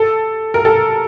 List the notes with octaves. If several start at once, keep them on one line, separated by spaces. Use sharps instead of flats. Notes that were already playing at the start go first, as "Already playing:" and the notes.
Already playing: A4
A#4
A4